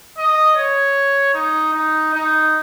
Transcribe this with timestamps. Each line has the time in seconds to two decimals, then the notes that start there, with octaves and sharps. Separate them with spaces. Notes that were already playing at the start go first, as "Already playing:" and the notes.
0.17 D#5
0.56 C#5
1.34 D#4
1.73 D#4
2.14 D#4